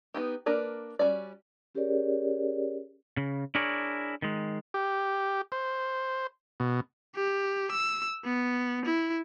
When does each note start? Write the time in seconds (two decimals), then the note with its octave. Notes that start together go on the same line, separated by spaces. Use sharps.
0.14 B3 D#4 G4
0.46 A#3 D4 A#4 B4 D5
0.99 G3 C#4 F#4 D5
1.75 C#4 G4 G#4 A#4 C#5 D5
3.17 C#3
3.55 D4 E4 G#4 A#4 C#5 D5
4.22 D#3 G#3
4.74 G4
5.52 C5
6.60 B2
7.15 G4
7.71 E6
8.24 B3
8.85 E4